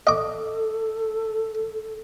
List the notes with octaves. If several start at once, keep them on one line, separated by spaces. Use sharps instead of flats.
A4 D#5 D6